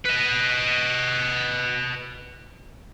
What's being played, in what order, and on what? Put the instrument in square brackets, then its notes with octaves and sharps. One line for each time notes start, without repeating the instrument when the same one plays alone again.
[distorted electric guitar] B4 D#5